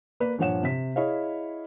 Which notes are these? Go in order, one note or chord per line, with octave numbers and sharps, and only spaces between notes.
A#3 B4 D5
G2 A#2 F3 C#5 F#5 E7
C3 B6
E4 G#4 C#5 D#5 F5